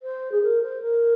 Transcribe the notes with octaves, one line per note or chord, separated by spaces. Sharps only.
C5
G#4
A#4
C5
A#4